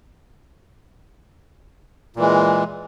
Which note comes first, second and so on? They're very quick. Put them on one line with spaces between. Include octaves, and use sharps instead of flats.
A#2 E3 G#3